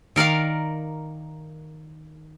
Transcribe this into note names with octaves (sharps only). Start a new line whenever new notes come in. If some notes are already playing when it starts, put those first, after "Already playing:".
D#3 A#4 D5 F5